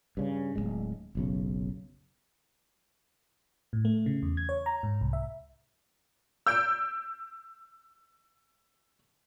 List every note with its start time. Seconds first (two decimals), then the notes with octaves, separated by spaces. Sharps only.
0.17 G2 C#3
0.56 D1 G#1 G#3
1.15 F#1 B1 C#3
3.73 A2
3.85 A3
4.06 C#3
4.22 E2
4.37 G#6
4.49 C#5
4.66 A#5
4.83 G#2
5.01 C2
5.13 E5
6.46 E6 G6 D7